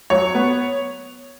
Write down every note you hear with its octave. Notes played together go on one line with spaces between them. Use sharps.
F#3 C#5
B3